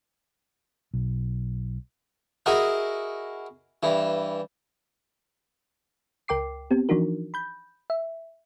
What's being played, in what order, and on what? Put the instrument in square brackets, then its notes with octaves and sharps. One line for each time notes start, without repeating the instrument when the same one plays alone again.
[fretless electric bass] B1
[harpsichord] E4 F#4 G#4 A#4 D#5
G2 E3
[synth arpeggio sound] C#2 A#4 G5 D6 C7
B3 C4 G4
E3 F3 D4 D#4 F#4 A#4
B5 G6
E5